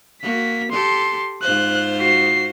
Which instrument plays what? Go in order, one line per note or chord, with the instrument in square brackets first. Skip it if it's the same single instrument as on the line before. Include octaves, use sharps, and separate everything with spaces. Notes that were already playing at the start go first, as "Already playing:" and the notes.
[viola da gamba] A#3 F#4 [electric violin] B6
[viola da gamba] G4 A4 [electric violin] C6
[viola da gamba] G#2 F4 C5 [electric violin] F#6
[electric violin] F#4 C7